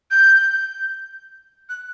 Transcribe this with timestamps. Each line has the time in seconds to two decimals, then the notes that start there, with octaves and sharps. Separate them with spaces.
0.11 G6
1.69 F#6